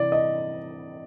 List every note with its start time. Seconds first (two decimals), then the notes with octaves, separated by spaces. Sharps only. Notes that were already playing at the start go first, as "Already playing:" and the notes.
Already playing: C3 E3 D5
0.12 D#5